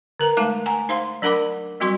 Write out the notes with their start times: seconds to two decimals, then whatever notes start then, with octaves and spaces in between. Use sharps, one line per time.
0.20 D3 A#4 B4 A#5
0.37 G#3 A3 D#4 A5 D6
0.66 F#5 G#5 A#5
0.89 D#4 C5 F5 C6
1.22 F#3 D4 A#4 F#5 B5 D6
1.80 F#3 G3 C4 F#4 C6 C#6